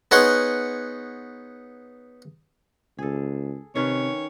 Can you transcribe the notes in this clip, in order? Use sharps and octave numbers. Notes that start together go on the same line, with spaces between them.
B3 D#4 G#4 C#5 F#5 C6
C#2 G#4 A4
C3 D#3 C#4 B4 C#5